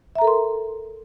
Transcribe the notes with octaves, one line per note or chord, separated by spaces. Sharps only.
A4 A#4 E5 A#5 C6